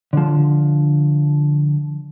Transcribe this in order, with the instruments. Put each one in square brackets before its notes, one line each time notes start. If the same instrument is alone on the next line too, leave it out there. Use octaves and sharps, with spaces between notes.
[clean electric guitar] D3 F3